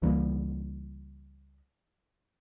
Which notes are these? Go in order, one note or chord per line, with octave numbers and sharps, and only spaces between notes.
C#2 E3 G3 A#3